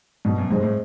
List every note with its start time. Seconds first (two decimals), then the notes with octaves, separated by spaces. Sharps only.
0.25 G2 B2
0.38 F#2
0.50 G2 G#3 C4
0.63 A2